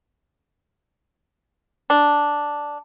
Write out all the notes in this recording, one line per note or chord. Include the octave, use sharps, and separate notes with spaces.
D4